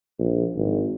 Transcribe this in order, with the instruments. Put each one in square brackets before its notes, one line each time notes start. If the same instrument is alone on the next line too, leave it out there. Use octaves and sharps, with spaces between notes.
[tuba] A#1
G#1